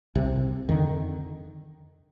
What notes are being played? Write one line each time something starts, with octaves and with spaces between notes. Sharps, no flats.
C2 C3
F2 D3 D#3